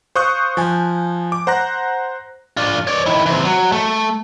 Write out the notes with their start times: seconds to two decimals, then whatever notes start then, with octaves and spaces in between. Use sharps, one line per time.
0.15 C5 F5 C#6 D#6 F#6 G6
0.57 F3 G#5
1.32 D6
1.47 C5 F#5 A#5 F#6 A#6
2.57 D4 F4
2.87 C#5 D5
3.06 D#3 E4
3.26 E3 C4
3.45 F#3
3.72 A3